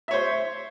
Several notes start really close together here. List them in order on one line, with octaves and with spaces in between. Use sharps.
E5 C#5 C5